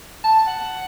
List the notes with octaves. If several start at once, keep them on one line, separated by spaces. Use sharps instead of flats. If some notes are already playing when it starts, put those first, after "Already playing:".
A5
F#5